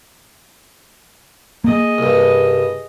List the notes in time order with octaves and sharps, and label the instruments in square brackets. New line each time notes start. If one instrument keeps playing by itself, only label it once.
[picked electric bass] A#3 [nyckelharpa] G#4 D#5
[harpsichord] C2 G2